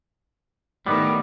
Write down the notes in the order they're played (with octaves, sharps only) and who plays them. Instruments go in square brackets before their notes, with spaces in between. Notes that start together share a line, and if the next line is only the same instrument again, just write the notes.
[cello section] A2 D#3 [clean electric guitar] G3 B3